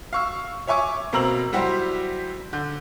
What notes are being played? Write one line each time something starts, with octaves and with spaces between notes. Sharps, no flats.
F5 C#6 E6
C#5 E5 G#5 C#6 D6
B2 A#3 C4 A#5 E6 F#7
F#3 G3 E4 F#4 G4 C5
D3 G6